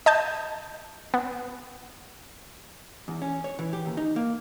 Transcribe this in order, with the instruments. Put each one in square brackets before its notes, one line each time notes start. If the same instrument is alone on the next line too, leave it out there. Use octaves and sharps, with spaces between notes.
[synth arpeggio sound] D#5 A5 G6
B3
[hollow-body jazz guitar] E2
C#4
C#5
E3
G4
D#2
D#4
A#3